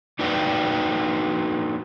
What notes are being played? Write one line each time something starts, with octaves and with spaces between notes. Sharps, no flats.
A#3 D#4 F#4 B4 D5 G5